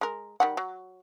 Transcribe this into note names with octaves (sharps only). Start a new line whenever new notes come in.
G#3 A#4
D#3 G3 F#5
F#3